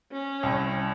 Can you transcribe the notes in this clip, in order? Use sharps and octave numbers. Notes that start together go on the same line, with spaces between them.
C#4
C2